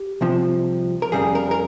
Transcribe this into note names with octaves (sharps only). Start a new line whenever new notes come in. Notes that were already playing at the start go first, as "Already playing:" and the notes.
Already playing: G4
C2 C3 F3
A#4
F2 C#3 G3 G#4
A#4
A#4